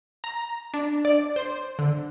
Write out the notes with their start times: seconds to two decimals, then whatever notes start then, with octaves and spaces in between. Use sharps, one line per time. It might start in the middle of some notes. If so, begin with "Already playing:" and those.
0.24 A#5
0.74 D4
1.05 D5
1.36 C5
1.79 D3